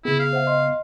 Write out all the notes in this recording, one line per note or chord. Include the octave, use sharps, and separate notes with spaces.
C#3 B3 E4 G#4
F5
C5 E5 F#5
D#5 C6